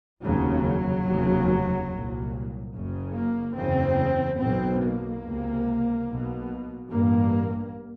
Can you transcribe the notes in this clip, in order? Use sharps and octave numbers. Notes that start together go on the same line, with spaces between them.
F1 D#2 C#3 F#3
F1 D#2 C#3
C2 A#2
F#1 F#2 C#3
A#3
F#1 E2 C#3 C4
B1 B2 C4
A#3
C#2 C3
B1 B2
A1 G2 A#3